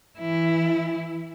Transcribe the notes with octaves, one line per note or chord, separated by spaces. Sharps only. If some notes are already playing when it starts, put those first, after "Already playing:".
E3 E4